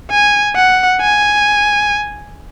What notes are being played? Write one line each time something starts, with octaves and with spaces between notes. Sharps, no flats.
G#5
F#5
G#5